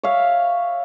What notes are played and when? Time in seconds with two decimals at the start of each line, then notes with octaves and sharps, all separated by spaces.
0.03 C#5 E5 F5